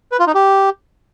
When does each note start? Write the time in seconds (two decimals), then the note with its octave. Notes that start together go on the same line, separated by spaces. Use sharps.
0.12 B4
0.19 F4
0.27 D#4
0.34 G4